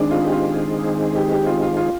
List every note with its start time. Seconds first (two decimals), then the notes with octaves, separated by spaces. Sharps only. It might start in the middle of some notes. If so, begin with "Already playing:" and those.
Already playing: D#3 G#3 C4 D4 D#4 G#4
0.11 F4
0.24 G4
0.32 F4
1.15 G4
1.31 G4
1.46 F4
1.62 F4
1.77 F4